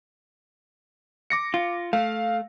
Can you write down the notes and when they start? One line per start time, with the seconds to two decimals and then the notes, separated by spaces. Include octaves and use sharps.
1.30 D6 A#6 C#7
1.54 F4
1.93 A3 F5